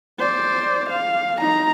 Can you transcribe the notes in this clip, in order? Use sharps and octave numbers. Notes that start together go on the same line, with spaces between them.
C5 D5
F5
D#4 A#5